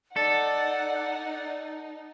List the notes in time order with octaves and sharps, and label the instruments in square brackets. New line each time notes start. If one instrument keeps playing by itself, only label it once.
[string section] D#4 [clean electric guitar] A4 [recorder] D5 [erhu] F#5